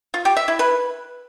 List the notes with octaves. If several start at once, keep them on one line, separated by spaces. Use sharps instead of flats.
F4
G4
E5
E4
B4